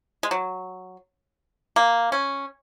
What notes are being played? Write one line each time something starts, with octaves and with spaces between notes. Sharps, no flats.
G#3
F#3
A#3
C#4